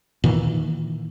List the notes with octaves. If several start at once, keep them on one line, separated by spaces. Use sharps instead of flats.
A#2 D#3 E3